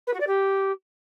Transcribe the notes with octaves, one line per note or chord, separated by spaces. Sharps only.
B4
F#4
D5
G4